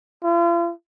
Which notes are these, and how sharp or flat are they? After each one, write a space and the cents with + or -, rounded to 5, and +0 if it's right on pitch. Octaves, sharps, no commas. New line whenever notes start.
F4 -40